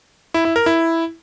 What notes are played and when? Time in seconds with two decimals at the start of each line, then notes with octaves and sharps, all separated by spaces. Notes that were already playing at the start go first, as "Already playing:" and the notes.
0.34 E4
0.45 E4
0.56 A#4
0.66 E4